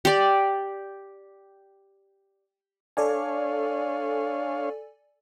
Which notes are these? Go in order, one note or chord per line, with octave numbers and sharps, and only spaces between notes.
G4 D5
D4 A4 C#5 D5 F5 G#5